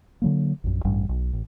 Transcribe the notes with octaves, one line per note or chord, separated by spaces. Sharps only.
D3 F#3 A#3
A#1 F#2
A1 G2 G3
B1
A1